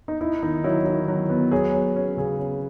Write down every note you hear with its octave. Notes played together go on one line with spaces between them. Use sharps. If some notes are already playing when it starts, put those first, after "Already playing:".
D#4
D#4 E4
D#3 D#4
F#3 E4
D#3 E4
F#3
B3
F#3 G#4
F#3
C#4
C#3 G#4
C#4